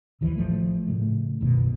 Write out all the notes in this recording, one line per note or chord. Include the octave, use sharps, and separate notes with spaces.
A#1 D#2 E3 F3
A1 F3 A3
A2 C#3 A3
F#1 B1 B2 D#3